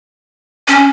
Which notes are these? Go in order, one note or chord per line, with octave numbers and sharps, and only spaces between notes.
C#4